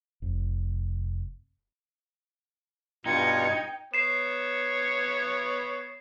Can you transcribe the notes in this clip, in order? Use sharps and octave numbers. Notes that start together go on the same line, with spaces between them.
F1
G2 B2 D#4 F4 G5 G#6 C#7
B3 C#5 C7 E7